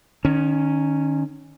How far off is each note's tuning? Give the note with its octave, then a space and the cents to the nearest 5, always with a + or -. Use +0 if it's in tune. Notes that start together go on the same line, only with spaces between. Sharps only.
D#3 -30 C#4 +0